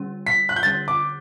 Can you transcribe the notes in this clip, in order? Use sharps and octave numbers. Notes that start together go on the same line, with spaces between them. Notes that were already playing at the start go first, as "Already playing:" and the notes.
Already playing: D3 G3 C#4
B6
F#6
G6
D3 G3 C#4 A6
D6